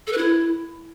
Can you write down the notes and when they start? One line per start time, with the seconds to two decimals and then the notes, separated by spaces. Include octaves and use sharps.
0.07 A4
0.12 B4
0.18 E4